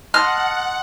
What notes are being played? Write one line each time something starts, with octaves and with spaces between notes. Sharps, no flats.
D#5 F#5 A5 C6 F6